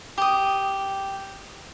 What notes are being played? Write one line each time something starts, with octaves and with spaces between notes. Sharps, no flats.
G4 D#6